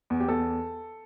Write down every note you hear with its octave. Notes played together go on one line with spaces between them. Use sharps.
E2
G4
E2 A4